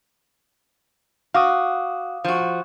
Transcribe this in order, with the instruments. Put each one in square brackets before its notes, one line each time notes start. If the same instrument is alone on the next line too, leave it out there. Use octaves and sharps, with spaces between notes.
[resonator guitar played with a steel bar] F#4 [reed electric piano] F5 D6 D#6
[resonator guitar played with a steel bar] F3 F#4